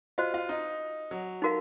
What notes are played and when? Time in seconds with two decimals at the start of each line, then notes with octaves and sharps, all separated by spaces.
0.18 F4 F#4 C5 D#5
0.34 F4
0.49 D#4
1.11 F#3
1.42 D#4 F#4 A#4 F5